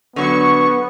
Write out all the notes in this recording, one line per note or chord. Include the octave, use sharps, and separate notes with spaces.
D3 F#3 B3 C#6